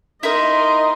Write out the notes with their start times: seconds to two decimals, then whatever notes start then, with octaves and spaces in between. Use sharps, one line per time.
0.23 D#4 E4 A#4 D#5 C6